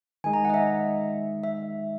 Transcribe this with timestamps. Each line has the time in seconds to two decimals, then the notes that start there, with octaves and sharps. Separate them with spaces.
0.24 D#3 G#3 D#4 G#5
0.33 A#5
0.45 F#5
0.49 D#5
0.54 E5
1.44 E5